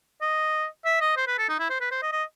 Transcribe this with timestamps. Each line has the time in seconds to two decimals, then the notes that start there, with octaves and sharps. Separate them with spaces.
0.22 D#5
0.85 E5
1.01 D#5
1.17 C5
1.27 B4
1.38 A4
1.49 D#4
1.60 E4
1.70 C5
1.81 B4
1.92 C5
2.02 D#5
2.12 D#5